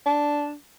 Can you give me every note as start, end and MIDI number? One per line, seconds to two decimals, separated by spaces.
0.06 0.55 62